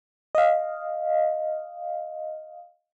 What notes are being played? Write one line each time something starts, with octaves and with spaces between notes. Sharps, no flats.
D#5 F5